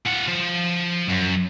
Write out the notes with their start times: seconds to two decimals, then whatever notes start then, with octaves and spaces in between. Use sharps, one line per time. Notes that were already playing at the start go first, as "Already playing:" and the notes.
0.07 F4 F#5
0.28 F3
1.08 F#2